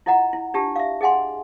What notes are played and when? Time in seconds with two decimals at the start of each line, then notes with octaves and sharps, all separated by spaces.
0.06 E4 F4 D#5 F#5 A#5
0.33 E4
0.54 D4 F4 G4 A5
0.76 E5 F5
1.01 G#4 D#5 F#5 G#5 C6